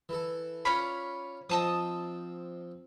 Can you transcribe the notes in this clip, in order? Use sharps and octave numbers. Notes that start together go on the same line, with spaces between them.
E3 A4
C#4 F4 C#5 D5 F5 B5
F3 C4 D#5 G5 A5 D#6